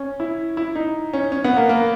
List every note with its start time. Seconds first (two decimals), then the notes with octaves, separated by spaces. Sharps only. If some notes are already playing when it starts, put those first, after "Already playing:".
Already playing: C#4
0.20 E4
0.57 E4
0.75 D#4
1.13 C#4
1.32 C#4
1.44 B3
1.57 A#3
1.69 A#3